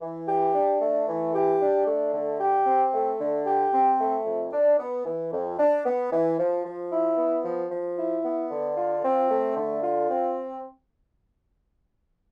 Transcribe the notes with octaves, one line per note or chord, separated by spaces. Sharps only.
E3
G4
D4
A3
E3
G4
D4
A3
D3
G4
C4
A3
D3
G4
C4
A3
F2
D4
B3
E3
F2
D4
B3
E3
F3
F3
E4
B3
F3
F3
E4
B3
D3
F4
C4
A3
D3
F4
C4